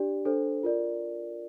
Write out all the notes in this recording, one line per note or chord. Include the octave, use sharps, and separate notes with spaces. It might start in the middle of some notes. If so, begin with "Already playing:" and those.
Already playing: D4 G4 D5
D4 A4 C5
F4 A#4 D5